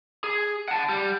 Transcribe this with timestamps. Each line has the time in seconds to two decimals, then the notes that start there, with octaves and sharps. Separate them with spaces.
0.24 G#4
0.68 F#5 A5
0.89 G3